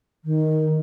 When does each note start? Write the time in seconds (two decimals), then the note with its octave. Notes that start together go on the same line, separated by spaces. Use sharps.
0.24 D#3